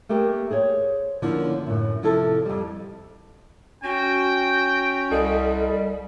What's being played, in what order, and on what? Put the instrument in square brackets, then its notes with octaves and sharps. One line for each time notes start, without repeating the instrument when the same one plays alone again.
[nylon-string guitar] A3 A#3 G4 A#4
G#4 C5 C#5
D3 F3 A#3 C#4 E4
F#2 A2
C3 F3 C4 E4 A4
F2 G3
[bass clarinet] C#4 [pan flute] F#4 [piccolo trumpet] G5
[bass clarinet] C2 [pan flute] G3 [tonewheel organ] A4 D#5